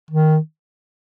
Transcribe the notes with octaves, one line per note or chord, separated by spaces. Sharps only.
D#3